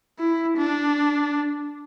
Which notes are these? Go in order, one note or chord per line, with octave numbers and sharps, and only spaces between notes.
E4
D4